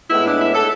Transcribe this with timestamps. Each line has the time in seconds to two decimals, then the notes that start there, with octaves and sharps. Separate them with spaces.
0.10 A2 G#3 B3 E4
0.25 D4
0.40 E4
0.54 A4